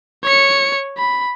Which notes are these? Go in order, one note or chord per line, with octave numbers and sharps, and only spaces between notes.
C#5 C#7
B5